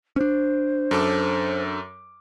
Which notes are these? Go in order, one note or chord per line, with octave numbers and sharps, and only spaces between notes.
C#4 D4 C5
F#2 A4 D6